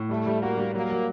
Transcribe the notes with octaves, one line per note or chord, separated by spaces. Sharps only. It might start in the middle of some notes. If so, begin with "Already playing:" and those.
Already playing: A2
G3 A3
G3
A#3 F#4
G3
F#3 A#3
F#3